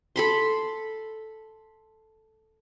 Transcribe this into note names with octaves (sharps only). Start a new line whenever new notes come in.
A4 B5 C6